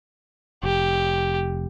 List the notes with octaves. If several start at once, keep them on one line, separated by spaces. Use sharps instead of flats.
F1 G4